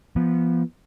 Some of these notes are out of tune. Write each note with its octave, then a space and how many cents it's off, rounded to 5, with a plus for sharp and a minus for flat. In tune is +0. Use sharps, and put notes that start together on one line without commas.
F3 -25 B3 -15